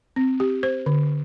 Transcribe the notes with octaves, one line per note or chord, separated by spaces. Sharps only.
C4
G4
C5
D3